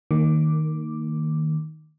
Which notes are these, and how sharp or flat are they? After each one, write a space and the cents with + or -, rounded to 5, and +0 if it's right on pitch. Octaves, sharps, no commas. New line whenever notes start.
D#3 +0 A#3 -30 D6 +0